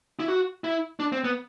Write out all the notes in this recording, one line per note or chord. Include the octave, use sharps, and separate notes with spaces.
E4
F#4
E4
D4
C4
B3